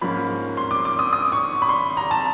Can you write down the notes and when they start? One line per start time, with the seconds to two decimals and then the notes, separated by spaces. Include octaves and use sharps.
0.01 G#2 F3 A#3 C#4 B5
0.57 C6
0.71 D6
0.85 D6
0.99 D#6
1.13 D#6
1.32 C#6
1.62 B5
1.69 C6
1.97 A#5
2.11 A5